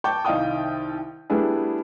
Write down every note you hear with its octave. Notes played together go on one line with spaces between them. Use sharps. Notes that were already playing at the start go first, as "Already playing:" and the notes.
G5 A5 C#6 D6 G6
C2 D#3 D#4 F5 G5 D#6
G3 A3 B3 D4 E4 G#4